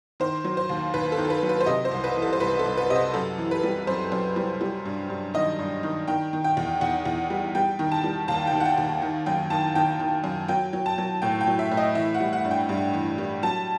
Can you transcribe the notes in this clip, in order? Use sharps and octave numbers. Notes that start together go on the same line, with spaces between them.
D#3 C5
F#3
C5
D#2
D#2 B4
A4
D#3
A4
B4
F#3
B4
C5
C3 D#5
C5
C2
B4
E3
A4
C5
C2 B4
A4
C2
B4
C3 D#5
C5
F#2 A4
E3
B4
G3
F#2 C5
F#2
G3
G3
G2
G2
D#3 D#5
G2
D#3
D#3 G5
D#3
G5
E2
E2 F#5
E2
G3
G3 G5
D#3
A5
G3
D#2 A5
G5
D#2
F#5
G5
D#2
D#3
F#2 G5
D#3 A5
D#3 G5
D#3
F#2
F#3 G5
F#3
A5
F#3
A2 G5
G5
F#3
E5
A2
D#5
E3 E5
F#5
G3
F#5
G2
G5
G2
E3
G3
F#3 A5